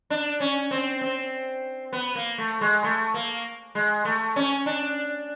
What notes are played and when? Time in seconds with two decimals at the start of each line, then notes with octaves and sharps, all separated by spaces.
0.10 D4
0.40 C#4
0.71 C4
1.01 C4
1.93 B3
2.15 A#3
2.38 A3
2.61 G#3
2.84 A3
3.14 A#3
3.75 G#3
4.05 A3
4.36 C#4
4.66 D4